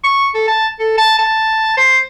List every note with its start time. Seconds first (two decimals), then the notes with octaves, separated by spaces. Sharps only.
0.04 C#6
0.35 A4
0.48 A5
0.80 A4
0.98 A5
1.19 A5
1.77 C5